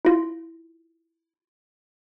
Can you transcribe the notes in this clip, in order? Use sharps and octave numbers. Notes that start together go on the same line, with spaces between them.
E4 F4